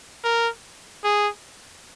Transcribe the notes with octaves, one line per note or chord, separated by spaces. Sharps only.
A#4
G#4